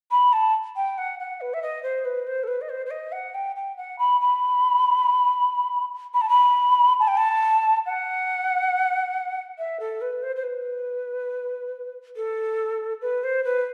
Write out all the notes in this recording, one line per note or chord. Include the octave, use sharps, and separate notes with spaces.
B5
A5
G5
F#5
F#5
B4
E5
D#5
C5
B4
C5
A4
B4
D#5
C5
C5
D#5
F#5
G5
G5
F#5
B5
B5
B5
A5
B5
A5
G5
A5
F#5
E5
A4
B4
C5
C5
B4
A4
B4
C5
B4